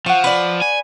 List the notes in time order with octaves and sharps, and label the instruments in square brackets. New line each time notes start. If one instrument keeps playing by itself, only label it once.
[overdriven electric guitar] F3 [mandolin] F#5 C#6
[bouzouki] B4 D5
[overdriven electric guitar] G#5